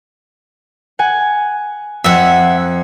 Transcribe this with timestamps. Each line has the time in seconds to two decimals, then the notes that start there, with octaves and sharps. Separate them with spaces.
0.99 F#5 G#5
2.04 F2 E5 F#5